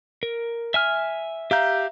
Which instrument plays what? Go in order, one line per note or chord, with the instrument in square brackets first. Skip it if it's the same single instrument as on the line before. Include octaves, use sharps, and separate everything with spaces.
[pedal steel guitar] A#4
E5 G#5 F6
[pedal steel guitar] G4 G6 [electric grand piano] E5 F5 A#5